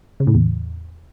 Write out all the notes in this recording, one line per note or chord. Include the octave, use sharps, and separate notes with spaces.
C#3
A2
E2